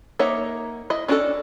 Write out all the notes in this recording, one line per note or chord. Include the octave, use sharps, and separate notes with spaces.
A#3 D#4 C#5 E5 F#5
E4 D#5
C#4 D4 F#4 G#4 A4